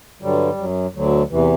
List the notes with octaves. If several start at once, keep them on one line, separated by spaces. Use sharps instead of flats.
G2 D3 F#3 G3
F#2 F#3
D2 D3 F#3
E2 C3 E3